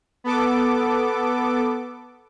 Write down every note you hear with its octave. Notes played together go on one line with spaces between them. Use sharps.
B3 A4 D6